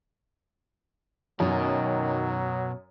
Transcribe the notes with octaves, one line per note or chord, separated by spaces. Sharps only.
F#2 B2 D#3 F#3